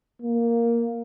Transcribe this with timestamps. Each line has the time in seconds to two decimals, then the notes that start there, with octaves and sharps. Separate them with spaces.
0.22 A#3